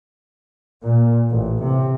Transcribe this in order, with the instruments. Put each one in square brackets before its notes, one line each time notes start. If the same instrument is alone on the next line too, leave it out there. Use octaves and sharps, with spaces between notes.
[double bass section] A#2
A1
C3